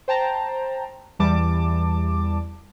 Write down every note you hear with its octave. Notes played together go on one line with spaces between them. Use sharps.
C5 G5 A5 A#5
E2 E3 G3 A5 D6